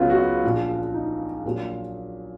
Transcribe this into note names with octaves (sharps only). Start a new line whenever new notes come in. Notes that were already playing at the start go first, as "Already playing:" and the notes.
Already playing: C#2 C#3 F#3 B3 F4
F#4
F4
A#1 A#2 F3
D#4
A#1 A#2 F#3